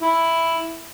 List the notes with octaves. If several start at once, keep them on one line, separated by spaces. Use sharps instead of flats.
E4